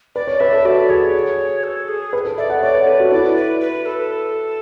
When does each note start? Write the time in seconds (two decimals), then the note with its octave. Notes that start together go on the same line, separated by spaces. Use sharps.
0.15 B4 D5
0.27 C#5
0.40 B4 E5
0.52 A4
0.65 F#4 D5
0.89 G#4 C#5
1.64 A4
1.88 G#4
2.13 B4
2.25 A4
2.38 D5 E5
2.50 F#5
2.62 C#5 D5
2.75 B4
2.87 A4 B4
3.00 F#4
3.11 E4 D5
3.36 B4
3.61 B4
3.86 A4